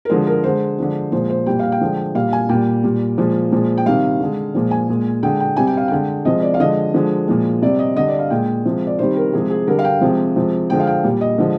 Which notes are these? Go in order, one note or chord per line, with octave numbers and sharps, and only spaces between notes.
A#4
D3 F3 G#3 C5
A#4
D3 G#3 C5
D3 F3 G#3
A#2 F3 G#3 C5
C5
A#2 G3 G5
F5
G5
D3 F3 G#3
A#2 G3 F5
G#5
A#2 G3 G5
A#2 G3
A#2 F3 G#3
A#2 F3 G#3
G5
C3 D#3 G3 F5
D3 G#3
A#2 F3 G#3
G#5
A#2 G#3
D3 G#3 G5
G5
C3 G3 G#5
G5
F5
D3 G#3 G5
C3 F3 G#3 D#5
D5
F5
D3 F3 G#3 D#5
D3 F3 G#3
A#2 F3 G#3
C3 G3 D5
D#5
D3 G3 D#5
D5
F5
A#2 G#3 G5
C3 F3 G#3
D5
C3 D#3 G3 C5
A#4
C3 F3 G#3 G#4
G#4
D3 G3 A#4
F5
G5
C3 F3 G#3
C3 F3 G#3
D3 F3 G#3 G5
F5
G5
A#2 G3
D#5
D3 F3 G#3